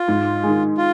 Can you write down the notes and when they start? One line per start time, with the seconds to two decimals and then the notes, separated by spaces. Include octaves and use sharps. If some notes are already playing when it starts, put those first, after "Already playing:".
Already playing: F4
0.08 G#2
0.43 D#3 G#3
0.77 F4